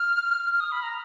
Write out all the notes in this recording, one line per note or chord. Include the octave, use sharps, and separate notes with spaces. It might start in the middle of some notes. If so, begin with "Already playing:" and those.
Already playing: F6
F6
D#6
B5
A#5